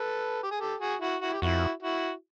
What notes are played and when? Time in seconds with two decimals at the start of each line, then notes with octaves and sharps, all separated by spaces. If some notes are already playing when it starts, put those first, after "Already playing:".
Already playing: A4 B4
0.43 G4
0.51 G#4
0.60 G4 A4
0.80 F#4 G#4
1.01 E4 F#4
1.21 E4 F#4
1.33 G4
1.42 F2 E4 F#4
1.83 E4 F#4